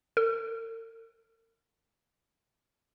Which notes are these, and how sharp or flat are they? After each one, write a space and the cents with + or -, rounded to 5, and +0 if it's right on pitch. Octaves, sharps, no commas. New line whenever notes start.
A#4 -45